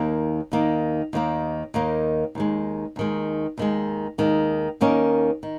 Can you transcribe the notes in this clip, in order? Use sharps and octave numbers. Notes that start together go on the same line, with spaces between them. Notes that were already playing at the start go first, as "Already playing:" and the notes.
Already playing: D#2 D#3 A#3
D#2 D#3 A#3
D#2 D#3 A#3
D#2 D#3 A#3
D#2 D#3 G#3
D#2 D#3 G#3
D#2 D#3 G#3
D#2 D#3 G#3
D#2 D#3 A#3 C#4
D#3